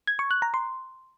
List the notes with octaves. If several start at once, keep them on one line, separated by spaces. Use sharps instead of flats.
G#6
C#6
F#6
A#5
C6